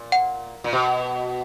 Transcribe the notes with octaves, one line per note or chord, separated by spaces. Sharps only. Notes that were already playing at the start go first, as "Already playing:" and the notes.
Already playing: A#2
F#5
A#2
B2